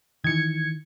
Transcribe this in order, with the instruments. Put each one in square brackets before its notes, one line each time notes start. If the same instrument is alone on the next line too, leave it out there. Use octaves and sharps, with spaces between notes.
[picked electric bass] D#3 E3 [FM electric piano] G#6 C#7